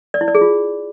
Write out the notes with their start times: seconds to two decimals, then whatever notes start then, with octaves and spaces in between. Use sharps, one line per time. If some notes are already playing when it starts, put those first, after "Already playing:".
0.14 D5
0.21 E4
0.28 D5
0.35 G#4
0.41 F4